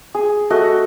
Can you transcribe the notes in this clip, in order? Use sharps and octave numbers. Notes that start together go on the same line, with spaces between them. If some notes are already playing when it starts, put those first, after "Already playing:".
G#4
A3 F#4 D#5